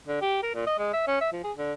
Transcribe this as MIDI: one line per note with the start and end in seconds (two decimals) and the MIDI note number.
0.07 0.21 50
0.21 0.40 67
0.43 0.51 70
0.55 0.65 46
0.67 0.75 75
0.79 0.90 56
0.93 1.05 76
1.07 1.17 61
1.21 1.31 76
1.32 1.40 53
1.44 1.52 68
1.57 1.73 50